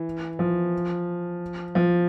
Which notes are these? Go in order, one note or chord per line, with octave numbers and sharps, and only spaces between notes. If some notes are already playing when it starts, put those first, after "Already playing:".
Already playing: E3
F3
F3